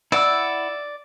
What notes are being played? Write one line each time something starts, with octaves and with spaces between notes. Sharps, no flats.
E4 D5 F#5 E6